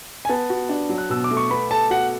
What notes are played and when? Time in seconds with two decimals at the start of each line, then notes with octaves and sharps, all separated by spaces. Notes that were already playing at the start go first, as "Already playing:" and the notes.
0.25 G#5
0.29 B3 A5
0.50 F#4
0.69 D4
0.90 F#3
0.98 F#6
1.09 B2 E6
1.24 D6
1.31 A3
1.37 C#6
1.50 B3 B5
1.71 A4 A5
1.90 F#4 F#5